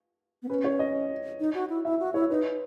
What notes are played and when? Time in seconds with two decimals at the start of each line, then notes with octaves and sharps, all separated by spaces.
0.43 B3
0.49 C#4 B4
0.64 C#5
0.79 D#5
1.40 D#4
1.55 F#4
1.70 E4
1.85 E4 E5
2.00 F#4
2.14 E4 C#5
2.30 D#4 B4